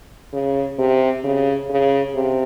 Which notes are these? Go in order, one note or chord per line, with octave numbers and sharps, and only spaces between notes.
C#3
C3
C#3
C#3
C3